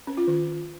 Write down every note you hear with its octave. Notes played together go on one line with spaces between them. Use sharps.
C#4
F4
D#3